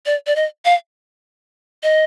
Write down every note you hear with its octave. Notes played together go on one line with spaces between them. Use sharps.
D5
D5
D#5
F5
D#5